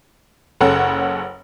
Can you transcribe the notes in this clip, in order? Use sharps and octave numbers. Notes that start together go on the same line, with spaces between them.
F#1 C#3 A4 C#5 F#5